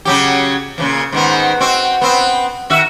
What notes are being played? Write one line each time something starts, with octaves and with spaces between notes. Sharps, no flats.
C#3 F#3 G4
A#2 C#3 E3
G#2 D#3 B3
C4 F#4
B3 C4
D#3 F#4 E5